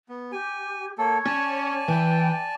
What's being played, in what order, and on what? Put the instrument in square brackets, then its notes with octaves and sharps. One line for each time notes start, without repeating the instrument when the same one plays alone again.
[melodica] B3
[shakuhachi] G4 [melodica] G#5
[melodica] A#3 A4 [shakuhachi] C#5
[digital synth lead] C#4 [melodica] D5 G#5 A5
[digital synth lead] E3 [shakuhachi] G5